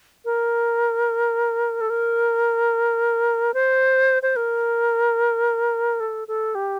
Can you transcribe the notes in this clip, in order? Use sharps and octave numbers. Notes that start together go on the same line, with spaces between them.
A#4
A4
A#4
C5
C5
A#4
A4
A4
G4